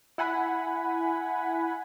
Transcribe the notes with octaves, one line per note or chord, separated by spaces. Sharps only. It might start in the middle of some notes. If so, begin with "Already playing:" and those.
E4 F#5 G#5 B5